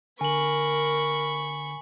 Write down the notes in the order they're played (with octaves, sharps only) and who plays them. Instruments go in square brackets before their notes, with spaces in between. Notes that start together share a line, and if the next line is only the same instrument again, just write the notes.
[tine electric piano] D3 [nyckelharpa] A#4 [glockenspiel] G#5 F#7 [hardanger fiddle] B5 C#6